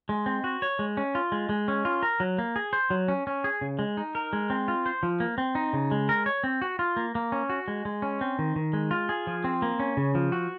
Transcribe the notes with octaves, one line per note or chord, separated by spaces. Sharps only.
G#3
C4
F#4
C#5
G#3
C#4
F4
G#3
G#3
C#4
F4
A#4
F#3
A#3
G#4
C5
F#3
C#4
C#4
G#4
C#3
G#3
D#4
A#4
G#3
C4
F4
C5
F3
A#3
C4
D#4
C#3
G#3
A#4
C#5
C4
F#4
F4
A#3
A#3
C#4
F#4
G#3
G#3
C#4
C4
D#3
D#3
G#3
F4
G#4
F3
C4
A#3
C#4
C#3
F3
F#4